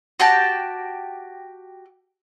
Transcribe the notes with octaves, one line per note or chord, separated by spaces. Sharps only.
F#4 G4 G5 A5